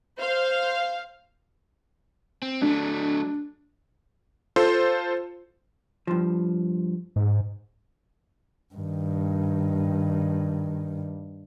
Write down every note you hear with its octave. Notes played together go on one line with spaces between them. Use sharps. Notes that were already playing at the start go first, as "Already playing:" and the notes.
C5 F5
C4
F#3 A3 D4
F4 A4 C5
G2 F3
G#2
G2 D#3